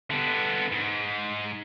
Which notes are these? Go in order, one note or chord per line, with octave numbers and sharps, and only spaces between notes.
D3 B3
G#2